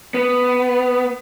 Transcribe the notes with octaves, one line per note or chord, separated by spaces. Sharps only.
B3